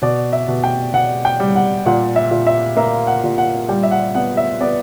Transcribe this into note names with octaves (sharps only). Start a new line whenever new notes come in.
B2 D5
E5
B2
G5
B2 F#5
G5
G3
F#5
A#2 F#5
E5
A#2
E5
A#3 E5
F#5
A#2
F#5
G3 G5
E5
F#5
B3 F#5
E5
B3 D5